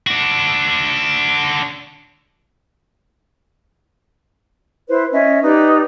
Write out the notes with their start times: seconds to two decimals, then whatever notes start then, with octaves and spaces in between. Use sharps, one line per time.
0.07 D4 F#4
4.89 E4 B4 C5
5.12 C#4 D#5 E5
5.42 D#4 G4 B4 D5